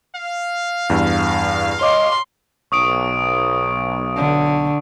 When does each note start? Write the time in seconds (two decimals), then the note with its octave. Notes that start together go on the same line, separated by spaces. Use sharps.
0.15 F5
0.90 E2 G2
1.81 C#5 D#5 C6 D6
2.72 B1 C#6 D#6 D7
4.16 D3